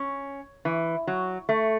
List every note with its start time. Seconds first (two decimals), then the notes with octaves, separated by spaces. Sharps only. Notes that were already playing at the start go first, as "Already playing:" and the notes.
Already playing: C#4
0.65 E3
1.07 F#3
1.49 A3